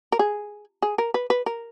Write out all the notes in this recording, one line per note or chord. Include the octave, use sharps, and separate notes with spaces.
A#4
G#4
G#4
A#4
B4
B4
A#4